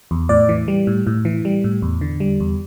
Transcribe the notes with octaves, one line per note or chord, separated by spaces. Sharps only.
E2
A2 D5
E3
G3
A2
A2
E3
G3
A2
E2
D3
G3
E2